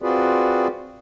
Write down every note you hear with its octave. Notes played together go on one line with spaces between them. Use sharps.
C4 F4 F#4 G#4 B4 D5